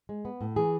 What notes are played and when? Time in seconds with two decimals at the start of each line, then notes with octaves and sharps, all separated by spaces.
0.09 G#3
0.25 B3
0.41 A2
0.56 E3 G#4